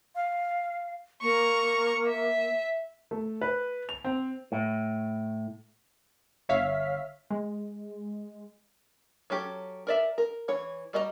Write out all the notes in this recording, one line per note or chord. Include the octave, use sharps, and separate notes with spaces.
F5
A#3 A#5 C#6
E5
A3
B4
F7
C4
A2
G1 C#5 E5 F5 F6 B6
G#3
F#3 C#4 G4 A4
A#4 D5 E5
A#4
E3 C#5
G3 F#4 D#5 E5 A#5